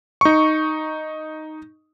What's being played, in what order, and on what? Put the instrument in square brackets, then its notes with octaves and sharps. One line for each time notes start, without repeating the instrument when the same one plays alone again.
[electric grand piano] D#4 C#6